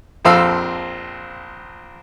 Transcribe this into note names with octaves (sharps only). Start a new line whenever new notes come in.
A#1 F2 C4 A4 F5 E6